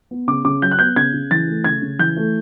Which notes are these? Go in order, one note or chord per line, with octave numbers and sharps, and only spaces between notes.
B3
C#3 D6
C#3 D6
F#3 G6
F#6
B3 G6
C#3 G#6
C#3
E3 A6
A3
C#3 G#6
C#3
E3 G6
A3